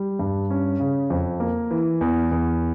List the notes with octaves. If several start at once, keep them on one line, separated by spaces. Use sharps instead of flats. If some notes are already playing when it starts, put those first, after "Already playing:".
Already playing: G3
G2
C#4
C#3
F2
A#3
E3
E2
E2